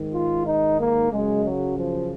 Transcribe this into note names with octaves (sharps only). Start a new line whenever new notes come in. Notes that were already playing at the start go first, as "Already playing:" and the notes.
Already playing: G#2 D#3
F4
D#4
A#3
F#2 C#3 G#3
F#3
F3